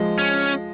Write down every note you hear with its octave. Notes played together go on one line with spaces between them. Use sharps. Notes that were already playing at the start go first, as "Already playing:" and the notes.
Already playing: F3 G#3
C#4